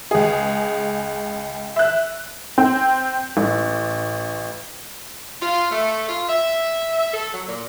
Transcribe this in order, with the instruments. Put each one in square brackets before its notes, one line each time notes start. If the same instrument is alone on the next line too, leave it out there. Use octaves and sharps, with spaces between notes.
[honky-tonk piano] C#2 G#4
E5 F#6
C4
A1
[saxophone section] F4
A3
F4
E5
A4
F#3
A#2